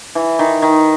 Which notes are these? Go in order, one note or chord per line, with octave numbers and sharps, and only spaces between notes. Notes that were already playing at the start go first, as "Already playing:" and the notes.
E3
D#3
D#3